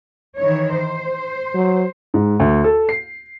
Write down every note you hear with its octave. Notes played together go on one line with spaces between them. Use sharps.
D#3 E3 C#5
C5
F#3
G#2
D2
A4
C7